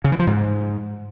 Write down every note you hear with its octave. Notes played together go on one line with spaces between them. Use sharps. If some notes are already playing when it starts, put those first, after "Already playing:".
C#3
E3
F3
G#2